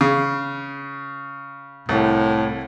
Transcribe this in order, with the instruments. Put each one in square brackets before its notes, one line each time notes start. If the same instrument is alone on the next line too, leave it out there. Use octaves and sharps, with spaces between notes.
[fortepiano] C#3
[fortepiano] C2 [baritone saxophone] A2